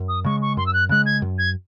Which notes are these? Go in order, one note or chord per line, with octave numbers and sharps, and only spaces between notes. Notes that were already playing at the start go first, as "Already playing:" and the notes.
Already playing: F#2
D#6
C#3 G#3 C#6
C#6
F#2 C6
E6
F#6
C#3 G#3 F#6
G#6
F#2
G#6